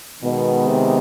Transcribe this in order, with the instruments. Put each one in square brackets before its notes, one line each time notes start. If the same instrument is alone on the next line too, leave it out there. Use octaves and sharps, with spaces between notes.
[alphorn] B2 [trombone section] D#3 G#3 B3
[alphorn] C3